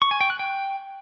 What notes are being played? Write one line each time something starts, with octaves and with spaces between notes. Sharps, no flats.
C#6
G#5
G5
F#6
G5